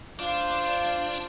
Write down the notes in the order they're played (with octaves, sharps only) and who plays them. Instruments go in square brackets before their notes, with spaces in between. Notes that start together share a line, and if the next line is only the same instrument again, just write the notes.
[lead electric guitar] D4 [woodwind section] F4 C5